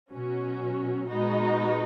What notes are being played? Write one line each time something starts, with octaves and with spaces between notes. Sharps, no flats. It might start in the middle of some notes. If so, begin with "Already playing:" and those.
B2 F#3 C#4 F#4
A#2 G#3 B3 D#4 F#4